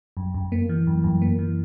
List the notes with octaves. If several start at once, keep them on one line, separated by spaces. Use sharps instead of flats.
F#2
F#2
A#3
E3
F#2
F#2
A#3
E3